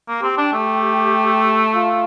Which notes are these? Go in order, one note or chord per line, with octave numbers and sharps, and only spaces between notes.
A#3
C4 G4
D4
A3
F4